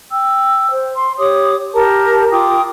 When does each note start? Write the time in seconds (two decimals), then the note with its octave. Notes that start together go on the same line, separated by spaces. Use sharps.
0.10 G5 E6
0.70 C5
0.94 C6
1.18 G4 C#5 D6 D#6
1.75 G4 A#4 A5 A#5
2.31 F4 G5 D6 D#6